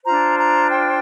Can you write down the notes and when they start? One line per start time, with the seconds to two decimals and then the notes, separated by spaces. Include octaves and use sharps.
0.05 D4 F4 C5 A#5
0.38 A#5
0.71 G5